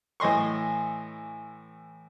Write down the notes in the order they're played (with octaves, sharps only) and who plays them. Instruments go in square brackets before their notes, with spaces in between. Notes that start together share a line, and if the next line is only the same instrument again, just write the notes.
[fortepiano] A2 E3 D#5 C6 C#6